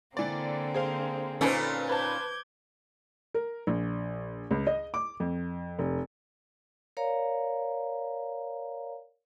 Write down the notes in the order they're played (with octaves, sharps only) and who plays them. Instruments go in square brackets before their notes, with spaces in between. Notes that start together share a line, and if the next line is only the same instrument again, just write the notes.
[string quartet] D3 A#3 C4 [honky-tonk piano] E3 D5
[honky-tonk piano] G#4 C5 F5
[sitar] A#2 C#4 D#4 [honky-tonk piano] A4 B4 C5
[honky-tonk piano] B4 C5 A5 [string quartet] D6 G6 G#6
[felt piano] A#4
A#1
C#2
D#5
D6
F2
F1
[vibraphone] A#4 C#5 D5 F5 A#5